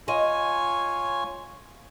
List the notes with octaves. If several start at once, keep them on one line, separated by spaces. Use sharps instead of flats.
F4 C#5 D#5 G#5